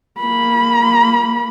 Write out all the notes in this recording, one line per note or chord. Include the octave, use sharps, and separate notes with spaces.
A#3 B5